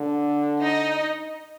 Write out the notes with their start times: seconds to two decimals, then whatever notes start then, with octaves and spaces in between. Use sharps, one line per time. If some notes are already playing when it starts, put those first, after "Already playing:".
Already playing: D3
0.62 D#4 D#5